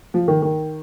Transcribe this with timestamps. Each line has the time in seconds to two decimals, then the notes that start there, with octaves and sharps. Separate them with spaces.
0.14 F3
0.28 D#3
0.42 D#3